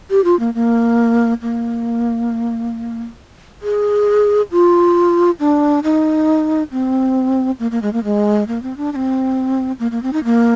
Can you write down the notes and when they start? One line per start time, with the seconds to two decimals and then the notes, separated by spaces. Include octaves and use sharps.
0.10 G4
0.24 F4
0.39 A#3
0.54 A#3
1.42 A#3
3.62 G#4
4.51 F4
5.40 D4
5.84 D#4
6.72 C4
7.59 A#3
7.71 A#3
7.82 G#3
7.93 A#3
8.04 G#3
8.48 A#3
8.63 C4
8.77 D4
8.93 D4
8.96 C4
9.80 A#3
9.91 A#3
10.03 C4
10.13 D#4
10.24 A#3